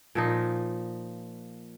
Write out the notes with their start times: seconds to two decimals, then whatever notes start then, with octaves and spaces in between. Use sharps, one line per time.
0.15 A#2 F3 D#4